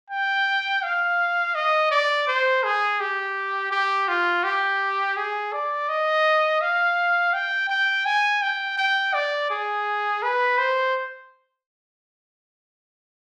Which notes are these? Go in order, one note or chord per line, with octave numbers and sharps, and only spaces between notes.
G5
F5
D#5
D5
C5
G#4
G4
G4
F4
G4
G#4
D5
D#5
F5
G5
G5
G#5
G5
G5
D5
G#4
B4
C5